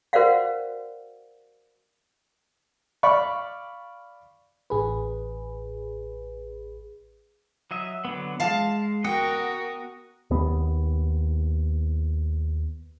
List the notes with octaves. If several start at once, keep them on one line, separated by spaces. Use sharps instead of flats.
F#4 A#4 C5 D5 F5 F#5
D5 F5 B5 C#6
A1 G#4 B4
F#3 D#5 E5
D3 F#3 B3
G#3 F5 A5
B3 F#4 A#4 D#5 F#5 G5
D#2 B3